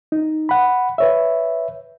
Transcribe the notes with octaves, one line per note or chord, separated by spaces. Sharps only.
D#4
F#5 B5
B4 C#5 E5